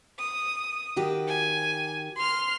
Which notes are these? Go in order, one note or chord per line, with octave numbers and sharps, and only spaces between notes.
D#6
D#3 F#4 G4
G#5
C6 F6